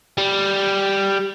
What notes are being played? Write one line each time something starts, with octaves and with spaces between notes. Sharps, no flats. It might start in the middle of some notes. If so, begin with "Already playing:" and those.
G3